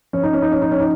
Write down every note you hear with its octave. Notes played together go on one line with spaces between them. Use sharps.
F3 C#4
D#4
C#4
D#4
C#4
D#4
C#4
D#4